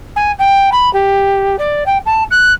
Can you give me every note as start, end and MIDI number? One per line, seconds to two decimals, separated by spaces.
0.16 0.32 80
0.39 0.70 79
0.72 0.92 83
0.93 1.56 67
1.58 1.83 74
1.86 1.98 79
2.06 2.23 81
2.31 2.52 90